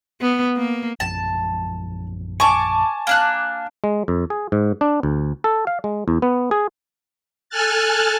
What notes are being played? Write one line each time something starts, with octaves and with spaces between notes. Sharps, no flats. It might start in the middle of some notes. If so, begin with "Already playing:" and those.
B3
A#3
A#1 F#2 F3 A5
G#5 A5 C#6 D6
A#3 D4 F#6
G#3
F2
G#4
G#2
D4
D2
A4
F5
G#3
E2
B3
G#4
A4 G#5 A5 F6 F#6 A6